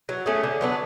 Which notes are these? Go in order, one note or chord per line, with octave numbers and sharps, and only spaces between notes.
F#3
A3 C#4 G#4
D3
F#3 B3 D4